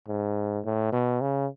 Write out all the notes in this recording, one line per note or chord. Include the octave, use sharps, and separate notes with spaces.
G#2
A2
B2
C#3